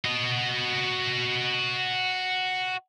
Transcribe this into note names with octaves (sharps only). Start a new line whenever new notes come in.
F#4 D#5